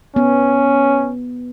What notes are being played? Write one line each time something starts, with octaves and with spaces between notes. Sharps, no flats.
B3 C#4